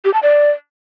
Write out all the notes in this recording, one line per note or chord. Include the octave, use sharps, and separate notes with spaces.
G4
A5
D5